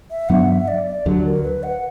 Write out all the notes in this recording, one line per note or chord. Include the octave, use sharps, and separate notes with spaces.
E5
G2 F#3 B3 D4 F#5
E5
D5
D5
D2 D3 F#3 G4
A#4
B4
F#5